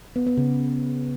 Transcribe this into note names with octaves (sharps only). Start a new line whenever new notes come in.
B3
B3
C#3